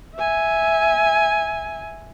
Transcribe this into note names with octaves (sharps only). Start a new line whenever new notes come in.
E5 G#5